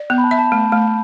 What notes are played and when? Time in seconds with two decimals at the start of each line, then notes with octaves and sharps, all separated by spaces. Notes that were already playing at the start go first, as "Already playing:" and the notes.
Already playing: D5
0.10 B3 G6
0.18 B5
0.24 A5
0.31 E5
0.38 A5
0.52 A3
0.72 A3